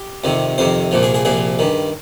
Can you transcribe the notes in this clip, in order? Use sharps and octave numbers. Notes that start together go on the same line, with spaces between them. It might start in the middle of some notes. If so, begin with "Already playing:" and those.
Already playing: G4
F2 C3 D#3
F2 C3 D#3 C5
C2 A#2 F3
G#4
G#4
C2 A#2 F3 G#4
G2 D#3